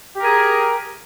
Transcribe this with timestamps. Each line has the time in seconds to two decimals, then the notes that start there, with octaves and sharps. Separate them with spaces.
0.16 G4
0.20 A#4
0.24 G#4